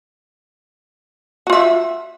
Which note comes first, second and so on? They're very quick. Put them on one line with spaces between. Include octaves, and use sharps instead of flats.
F#4 F4 E5